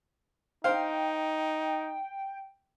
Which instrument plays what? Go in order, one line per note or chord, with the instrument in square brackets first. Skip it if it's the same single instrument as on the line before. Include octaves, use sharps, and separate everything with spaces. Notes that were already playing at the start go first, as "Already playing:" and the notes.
[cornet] D#4 [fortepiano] C5 F5 [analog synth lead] G5